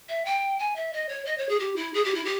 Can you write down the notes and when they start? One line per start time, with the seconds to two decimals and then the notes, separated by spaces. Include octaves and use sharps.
0.09 E5
0.25 G5
0.59 G#5
0.76 E5
0.93 D#5
1.09 C#5
1.25 D#5
1.38 C#5
1.49 G#4
1.59 G4
1.76 E4
1.94 G#4
2.04 G4
2.15 E4
2.25 G4